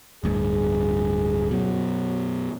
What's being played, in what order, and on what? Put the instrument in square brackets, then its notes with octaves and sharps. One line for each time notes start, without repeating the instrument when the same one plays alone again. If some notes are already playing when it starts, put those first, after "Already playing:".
[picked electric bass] D1 D2 G2 [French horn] G#4
[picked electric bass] F#2 B2 [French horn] F#3